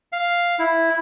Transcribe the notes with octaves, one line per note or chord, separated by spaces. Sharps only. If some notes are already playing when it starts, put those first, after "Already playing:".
F5
E4